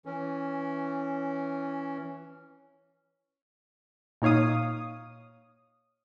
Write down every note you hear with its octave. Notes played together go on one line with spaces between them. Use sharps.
E3 C#4
A#2 D#4 C#5 F5 D#6